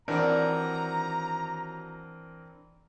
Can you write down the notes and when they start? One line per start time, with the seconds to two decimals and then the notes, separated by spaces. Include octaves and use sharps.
0.08 D#2 E3 C4 D4 F#4 A#4 D5 A#5